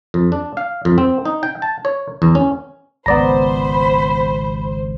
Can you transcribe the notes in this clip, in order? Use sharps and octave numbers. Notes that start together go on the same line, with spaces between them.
F2
D4
F5
F2
C4
D#4
G5
A5
C#5
E2
C#4
G#1 C#2 B3 C5 D5 A#5 B5